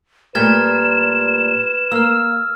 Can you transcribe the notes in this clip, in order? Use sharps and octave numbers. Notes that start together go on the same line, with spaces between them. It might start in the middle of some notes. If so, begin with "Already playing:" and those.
A#2 G3 A3 B4 F6 G#6 A6 E7
A#3 E6 F6